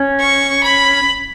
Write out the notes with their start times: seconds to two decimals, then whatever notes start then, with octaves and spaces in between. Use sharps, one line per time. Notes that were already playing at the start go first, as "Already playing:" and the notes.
Already playing: C#4
0.20 C#6
0.63 B5